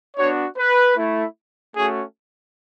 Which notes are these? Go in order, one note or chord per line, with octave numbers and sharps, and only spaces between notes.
B3 D4 F#4 C#5
B4
A3 E4
A3 C#4 F#4 G#4